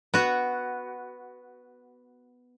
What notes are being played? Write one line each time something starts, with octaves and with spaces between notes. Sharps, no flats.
B3 F#4